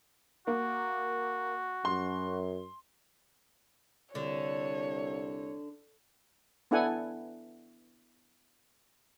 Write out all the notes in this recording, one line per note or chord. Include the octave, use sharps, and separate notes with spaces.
A#3 F#4
F#2 C6
C2 D3 C#5
B3 D4 E4 A4 F#5 G#5